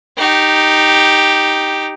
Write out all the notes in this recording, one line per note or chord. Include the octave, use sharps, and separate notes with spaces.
D#4 G4